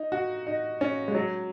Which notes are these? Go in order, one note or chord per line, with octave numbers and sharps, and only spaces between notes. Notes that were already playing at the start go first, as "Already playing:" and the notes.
Already playing: D#4
F#4
D#4
C#4
G#3
F#3